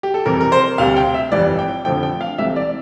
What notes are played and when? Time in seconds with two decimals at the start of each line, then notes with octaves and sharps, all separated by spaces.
0.03 G4
0.14 A4
0.25 F2 C3 E3 G3 A#4
0.41 A#4
0.52 C5
0.78 D2 C3 G3 F5
0.96 G5
1.14 E5
1.32 G1 F2 E3 G3 D5
1.59 G5
1.85 F2 D3 F3 A3 G5
2.03 G5
2.21 F5
2.38 C2 C3 E3 A3 E5
2.56 D5